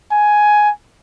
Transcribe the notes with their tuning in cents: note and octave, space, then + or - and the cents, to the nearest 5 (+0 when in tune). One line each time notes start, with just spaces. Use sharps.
G#5 +10